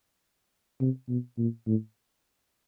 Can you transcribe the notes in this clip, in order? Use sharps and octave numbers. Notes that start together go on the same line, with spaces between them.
C3
B2
A#2
A2